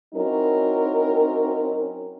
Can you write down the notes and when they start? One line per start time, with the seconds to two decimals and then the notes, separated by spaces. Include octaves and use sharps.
0.14 F#3 C4 C#4 D#4 E4 A#4